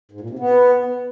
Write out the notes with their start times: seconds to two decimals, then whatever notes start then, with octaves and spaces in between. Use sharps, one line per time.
0.12 G#2
0.21 A#2
0.30 C3
0.39 B3